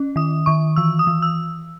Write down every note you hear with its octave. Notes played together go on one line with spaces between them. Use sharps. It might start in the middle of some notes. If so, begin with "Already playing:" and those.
Already playing: C#4
D#3 D#6
D#3 C#6
E3 E6
D#6
E3
E6